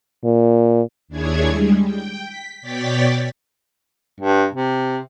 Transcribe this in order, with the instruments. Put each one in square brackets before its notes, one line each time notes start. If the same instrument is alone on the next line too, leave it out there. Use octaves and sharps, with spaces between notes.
[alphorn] A#2
[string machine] D#2 D4 E4 G#4 C#5 G#6
G3 G#3
G5
B6
B2 C#5 D5 G5 A6 B6
[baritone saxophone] G2
C3